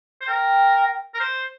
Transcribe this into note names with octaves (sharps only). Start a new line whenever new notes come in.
C5
A#4 G5
A#4
C5